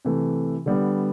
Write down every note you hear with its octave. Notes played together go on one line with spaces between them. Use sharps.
C3 E3 A3
D3 G3 B3